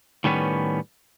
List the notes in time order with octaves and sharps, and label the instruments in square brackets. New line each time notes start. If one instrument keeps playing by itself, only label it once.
[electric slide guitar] A2 D#3 G3 B3 C#4 B4